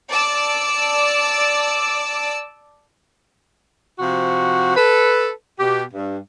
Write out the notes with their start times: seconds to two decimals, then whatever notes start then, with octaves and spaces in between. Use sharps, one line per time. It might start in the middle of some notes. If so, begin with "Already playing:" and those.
0.11 D5 A5 D6 E6
4.00 C3 F3 F#4
4.77 A4 B4
5.60 B2 G4
5.93 G2